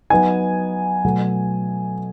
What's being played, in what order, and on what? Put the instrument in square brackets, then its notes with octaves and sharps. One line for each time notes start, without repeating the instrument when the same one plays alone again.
[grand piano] F#3 B3 D#4 G#5
B2 F#3 A3